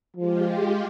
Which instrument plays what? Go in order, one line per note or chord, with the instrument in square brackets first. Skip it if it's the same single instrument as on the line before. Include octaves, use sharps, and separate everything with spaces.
[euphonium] F3 [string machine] G#3 F4 G4